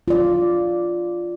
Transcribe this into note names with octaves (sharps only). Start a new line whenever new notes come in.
F4 D5